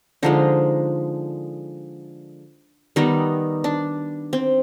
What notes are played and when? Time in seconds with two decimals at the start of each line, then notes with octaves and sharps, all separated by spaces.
0.23 D3 F3 G#3 D#4
2.96 D#3 G3 B3 D#4
3.64 D4
4.33 C4